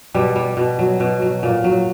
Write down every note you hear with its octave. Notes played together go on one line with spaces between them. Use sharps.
B2 G3
G3
B2
F#3
B2
F#3
A#2
F#3